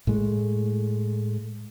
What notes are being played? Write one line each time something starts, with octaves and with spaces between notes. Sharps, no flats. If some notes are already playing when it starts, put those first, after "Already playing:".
A2 G#3 A3